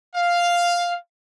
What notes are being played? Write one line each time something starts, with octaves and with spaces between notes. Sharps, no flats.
F5